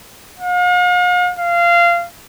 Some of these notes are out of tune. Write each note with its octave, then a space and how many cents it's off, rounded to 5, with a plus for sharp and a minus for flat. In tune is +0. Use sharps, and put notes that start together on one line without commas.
F5 +45
F5 -20